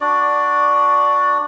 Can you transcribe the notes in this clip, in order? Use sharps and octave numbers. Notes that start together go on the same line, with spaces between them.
D4 F#4 D5